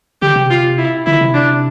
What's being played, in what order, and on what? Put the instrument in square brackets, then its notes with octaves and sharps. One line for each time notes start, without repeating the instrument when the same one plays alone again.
[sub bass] D3 [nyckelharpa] G4
[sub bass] C3
[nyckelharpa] F4
E4
[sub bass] D3 [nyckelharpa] E4
[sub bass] C3
[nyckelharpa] D4